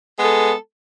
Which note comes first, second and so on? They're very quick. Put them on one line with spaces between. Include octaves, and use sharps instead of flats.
B3 G#3 A4